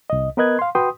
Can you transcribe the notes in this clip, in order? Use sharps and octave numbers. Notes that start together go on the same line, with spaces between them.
C2 D#5
B3 A#4 B4 D#5 F#6 G#6
F5 C6
F#4 B4 G5 C6 D#6